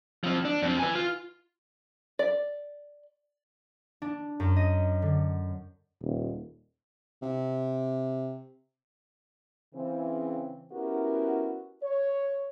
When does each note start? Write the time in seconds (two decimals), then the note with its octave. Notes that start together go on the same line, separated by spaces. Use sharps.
0.24 F3 C4
0.45 D4
0.62 F2 C4
0.79 B4 G#5
0.95 F4
2.19 D5
4.02 D4
4.40 F#2
4.56 D#5
5.02 D3
6.02 D#1
7.22 C3
9.74 C#3 E3 C4
10.72 B3 C#4 E4 F#4 G4 A#4
11.81 C#5